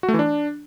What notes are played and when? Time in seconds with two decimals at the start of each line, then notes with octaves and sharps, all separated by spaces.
0.03 F#4
0.08 A3
0.14 E3
0.19 D4